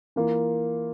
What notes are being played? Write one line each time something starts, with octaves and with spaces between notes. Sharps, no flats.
E3 A#3 F4